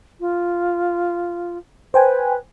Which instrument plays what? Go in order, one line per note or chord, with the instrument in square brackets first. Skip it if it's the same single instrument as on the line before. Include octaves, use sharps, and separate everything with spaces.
[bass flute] F4
[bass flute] B4 [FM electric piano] C5 G5 G#5